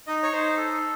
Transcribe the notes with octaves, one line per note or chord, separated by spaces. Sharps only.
D#4 D#5
C#5
D#4 C5
A4